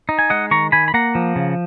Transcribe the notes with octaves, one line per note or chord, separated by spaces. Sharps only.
D#4
G#5
G#3 D#5 F#5
D#3 A#5 C#6
D#3 G#5 B5
B5
A#3 F#5 A#5
F3
C#3